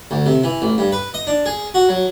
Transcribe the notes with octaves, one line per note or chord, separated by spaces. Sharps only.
D2
C3
E3
A1
G2
B4
D#5
D4
G#4
F#4
F#3